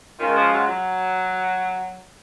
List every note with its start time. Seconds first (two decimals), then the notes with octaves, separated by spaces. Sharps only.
0.20 D#3 G#3 C#4 F4
0.35 F3
0.52 F#3
0.68 F#3